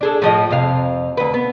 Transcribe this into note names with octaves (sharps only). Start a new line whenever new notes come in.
D4 G#4 A4
A2 F3 D#5
F2 C3 F5
D2 B4
B3